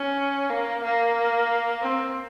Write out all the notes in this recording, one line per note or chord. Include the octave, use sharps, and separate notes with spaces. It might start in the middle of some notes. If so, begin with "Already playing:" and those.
Already playing: C#4
A#3
A#3
C4